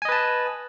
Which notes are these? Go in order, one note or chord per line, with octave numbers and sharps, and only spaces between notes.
B4 D#5 G#5 A5